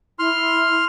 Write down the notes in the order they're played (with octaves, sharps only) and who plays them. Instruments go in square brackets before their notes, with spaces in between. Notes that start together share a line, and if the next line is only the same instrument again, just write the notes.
[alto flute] E4 [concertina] C6 F6